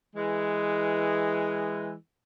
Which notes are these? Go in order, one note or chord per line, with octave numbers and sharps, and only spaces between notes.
E3 G#3